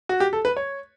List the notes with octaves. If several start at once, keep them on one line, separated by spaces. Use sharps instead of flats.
F#4
G4
A4
B4
C#5